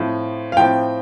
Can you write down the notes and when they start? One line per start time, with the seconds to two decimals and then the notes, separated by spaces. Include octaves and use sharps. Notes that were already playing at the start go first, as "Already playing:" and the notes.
Already playing: A2 F3 C4
0.52 F5
0.57 A2 F3 C4 G5